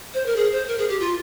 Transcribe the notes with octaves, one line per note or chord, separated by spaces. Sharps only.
C5
A#4
G#4
C5
A#4
G#4
G4
F4